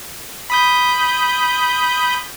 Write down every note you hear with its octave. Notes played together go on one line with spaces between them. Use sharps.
B5 D#6 G6